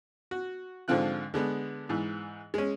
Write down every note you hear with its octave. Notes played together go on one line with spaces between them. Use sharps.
F#4
G#2 D3 F3 C4 F4 F#6
D3 G#3 B3
G#2 E3
G#3 C#4